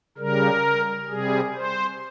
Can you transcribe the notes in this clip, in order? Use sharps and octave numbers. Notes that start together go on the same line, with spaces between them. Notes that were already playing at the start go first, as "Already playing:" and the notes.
C#3 G3 A#4
C3 G3 G#4
C5